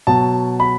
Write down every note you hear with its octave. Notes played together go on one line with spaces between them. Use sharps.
B2 F#3 A5
B5